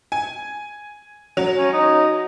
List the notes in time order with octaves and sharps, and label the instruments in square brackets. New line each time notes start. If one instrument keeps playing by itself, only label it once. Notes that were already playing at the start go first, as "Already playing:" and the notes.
[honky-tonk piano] G#5
F#3 F7
[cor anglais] C#4
D#4